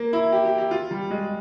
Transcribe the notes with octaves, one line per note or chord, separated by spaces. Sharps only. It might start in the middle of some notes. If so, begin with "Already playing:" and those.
Already playing: A#3
E4
G4
G4
G4
F4
G3
G#3